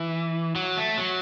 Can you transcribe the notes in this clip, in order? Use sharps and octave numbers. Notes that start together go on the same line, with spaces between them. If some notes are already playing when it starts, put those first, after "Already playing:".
Already playing: E3
F#3
A3
F#3